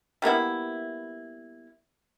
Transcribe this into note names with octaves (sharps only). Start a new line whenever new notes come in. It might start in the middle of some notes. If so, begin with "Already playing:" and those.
G3 A#3 B3 E4